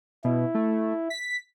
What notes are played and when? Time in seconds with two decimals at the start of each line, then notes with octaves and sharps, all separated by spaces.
0.24 B2 E4
0.55 A3
1.10 B6